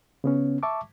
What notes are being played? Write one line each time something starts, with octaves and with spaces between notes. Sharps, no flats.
C#3 B3 C#4
E5 A5 C#6 D6